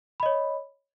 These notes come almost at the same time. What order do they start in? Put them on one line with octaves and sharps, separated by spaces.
B5 D#5 C#5